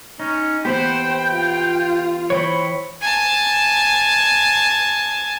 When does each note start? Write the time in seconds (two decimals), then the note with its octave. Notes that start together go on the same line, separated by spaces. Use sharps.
0.19 C#4 D#4
0.65 E3 B3 G4 C5 F#5 G5
1.33 F4
2.30 E3 C5 C#5 G5 B5
3.01 G#5 A5